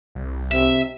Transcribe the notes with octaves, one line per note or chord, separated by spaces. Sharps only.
C2
C3 E5